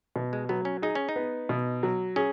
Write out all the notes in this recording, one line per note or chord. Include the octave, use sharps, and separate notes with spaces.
B2
G#3
F#3 B3
C#4
D#4 G#4
C#4
D#4
B3
B2
F#3
C#4 G#4